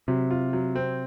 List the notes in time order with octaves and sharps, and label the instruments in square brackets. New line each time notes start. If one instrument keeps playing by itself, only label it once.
[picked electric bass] C3 [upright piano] F#3
[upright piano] F4
F#3
C4